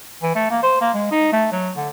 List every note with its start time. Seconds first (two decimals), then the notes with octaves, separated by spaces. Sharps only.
0.23 E3
0.35 A3
0.51 A#3
0.63 C5
0.81 A#3
0.94 G#3
1.11 D#4
1.32 A3
1.52 F#3
1.76 D3